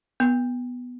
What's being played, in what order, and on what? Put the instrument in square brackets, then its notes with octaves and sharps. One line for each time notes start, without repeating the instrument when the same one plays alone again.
[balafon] B3